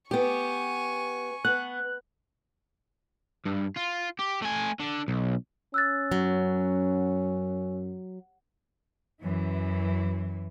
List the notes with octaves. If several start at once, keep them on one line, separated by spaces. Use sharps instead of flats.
B3 G4 G#5 C#6
B3 F#6
G2
F4
G4
A3 G#5
D3
B1
C#4 E6 F#6 A6
F#2 F#3
F#2 E3